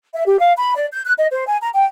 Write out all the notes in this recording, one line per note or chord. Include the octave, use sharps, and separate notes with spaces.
E5
G4
F5
B5
D5
G6
F#6
D#5
C5
G#5
A#5
G5